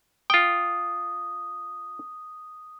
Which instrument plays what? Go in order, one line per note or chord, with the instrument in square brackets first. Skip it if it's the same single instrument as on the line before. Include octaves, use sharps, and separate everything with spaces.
[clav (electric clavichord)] F4 G5 [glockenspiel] D#6